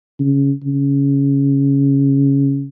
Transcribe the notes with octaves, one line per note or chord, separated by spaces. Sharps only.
C#3
C#3